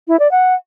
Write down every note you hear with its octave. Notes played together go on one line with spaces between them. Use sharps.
E4
D5
F#5